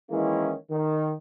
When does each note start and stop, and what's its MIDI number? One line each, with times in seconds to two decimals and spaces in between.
0.11 0.54 51
0.11 0.54 52
0.11 0.54 56
0.11 0.54 58
0.11 0.54 61
0.11 0.54 64
0.71 1.13 51